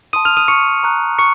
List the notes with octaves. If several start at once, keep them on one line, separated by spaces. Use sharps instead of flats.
A5 C6 D#6 D#7
F6 F7
D#6 D#7
C#6 C#7
A#5 C#6 F#6
C#6 C#7